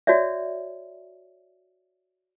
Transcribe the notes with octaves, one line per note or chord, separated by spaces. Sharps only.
F#4 C#5 D5 E5